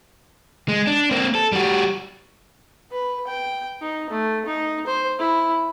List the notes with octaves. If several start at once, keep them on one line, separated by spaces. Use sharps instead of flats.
G#3
D4
A#3 C4
A4
G3 F#4
B4
G5
D#4
A3
D#4
C5
E4